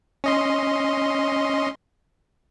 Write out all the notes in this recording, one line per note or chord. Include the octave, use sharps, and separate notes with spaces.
C#4 D#5 C6